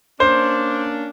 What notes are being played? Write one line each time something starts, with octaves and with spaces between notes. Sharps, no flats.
A#3 C#4 D4 C5